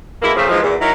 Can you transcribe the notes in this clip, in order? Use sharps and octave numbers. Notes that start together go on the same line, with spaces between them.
B2 G#3 A#3 E4
A#2 C#3 F3 A3 C4
G#2 E3 F3 G#3
E2 A#2
F#3 D#4 E4 A#4